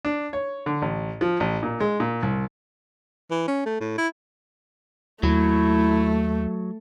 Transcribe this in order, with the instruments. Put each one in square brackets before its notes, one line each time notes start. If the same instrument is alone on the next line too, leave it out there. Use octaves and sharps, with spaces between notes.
[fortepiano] D4
C#5
D3
A1
F3
A1
A#2
G#3
A#2
C2
[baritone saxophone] E3
C#4
A3
A2
E4
[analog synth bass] D#2 [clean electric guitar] F#3 [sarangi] A3 [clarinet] E4